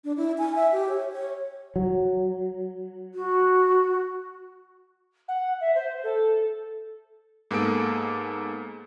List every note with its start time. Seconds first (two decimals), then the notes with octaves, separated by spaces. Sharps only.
0.04 D4
0.17 E4
0.38 G#5
0.55 E5
0.72 G4
0.89 C#5
1.12 C#5
1.76 F#3
3.15 F#4
5.28 F#5
5.60 E5
5.75 C5
6.03 A4
7.51 G#2 A#3 B3 G#4 A4 D7